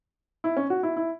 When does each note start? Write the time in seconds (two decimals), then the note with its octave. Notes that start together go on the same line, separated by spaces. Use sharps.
0.44 E4
0.57 C#4
0.70 F#4
0.83 E4
0.97 E4